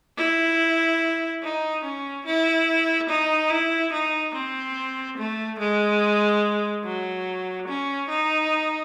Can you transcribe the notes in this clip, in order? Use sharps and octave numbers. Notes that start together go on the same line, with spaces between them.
E4
D#4
C#4
E4
D#4
E4
D#4
C4
A3
G#3
F#3
C#4
D#4